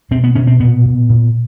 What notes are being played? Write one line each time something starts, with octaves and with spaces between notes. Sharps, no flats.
B2 C4
B3
B2 C#4
C4
A#2 B3
A#2
A#2